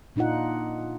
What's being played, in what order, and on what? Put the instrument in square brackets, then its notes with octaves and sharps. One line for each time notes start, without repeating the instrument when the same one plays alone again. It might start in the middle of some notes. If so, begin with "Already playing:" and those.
[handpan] A#2 D4 D#4 F4 F#5